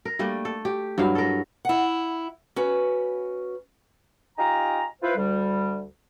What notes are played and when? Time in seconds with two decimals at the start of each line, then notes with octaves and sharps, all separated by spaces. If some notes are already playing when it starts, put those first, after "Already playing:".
0.05 A#4
0.19 G3 A3 A#3 D4
0.45 A4
0.65 G4
0.98 G2 F#3 E4 F5
1.15 A4 A#4
1.65 E4 F#5
2.56 C#4 F#4 B4
4.38 D#4 F4 G4 G#5 A#5
5.02 E4 F4 B4 C5
5.16 D2 G3